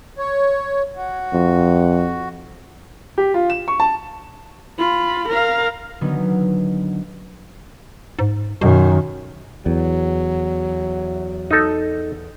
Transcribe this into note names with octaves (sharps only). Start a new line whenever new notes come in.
C#5
F#4
F2
G4
F4
E7
C#6
A5
F4 B5
A#4 F5
D3 D#3 F#3 B3 C#4 D#4
G#2
F#2 B2 D#3
E2 F#3
D#4 A4